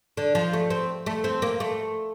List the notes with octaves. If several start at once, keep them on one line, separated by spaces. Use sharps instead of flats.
D3
F3
A3
C4
A3
C4
A#3
A3